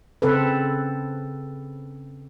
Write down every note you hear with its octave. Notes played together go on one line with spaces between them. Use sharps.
C#3 C4 A4 B4